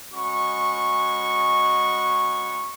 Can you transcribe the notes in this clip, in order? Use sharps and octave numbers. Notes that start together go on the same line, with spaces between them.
G#3 C#4 F#4 B5 C#6